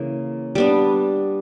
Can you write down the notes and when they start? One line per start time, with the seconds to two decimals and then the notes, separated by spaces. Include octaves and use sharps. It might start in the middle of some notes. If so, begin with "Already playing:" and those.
Already playing: C#3 E3 A#3
0.55 G3 B3 D4